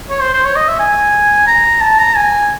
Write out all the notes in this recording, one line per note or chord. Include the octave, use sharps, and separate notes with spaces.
C#5
C5
C5
C#5
D#5
E5
G#5
A#5
A5
A#5
G#5